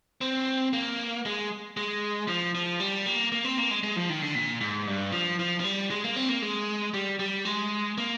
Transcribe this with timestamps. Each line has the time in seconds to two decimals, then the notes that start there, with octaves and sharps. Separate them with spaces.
0.21 C4
0.73 A#3
1.26 G#3
1.77 G#3
2.28 F3
2.55 F3
2.80 G3
3.06 A#3
3.32 A#3
3.44 C4
3.58 A#3
3.71 G#3
3.83 G#3
3.96 F3
4.09 D#3
4.22 D3
4.35 A#2
4.61 G#2
4.87 G2
5.12 F3
5.39 F3
5.60 F3
5.64 G3
5.90 G#3
6.04 A#3
6.16 C4
6.29 A#3
6.42 G#3
6.94 G3
7.19 G3
7.45 G#3
7.98 A#3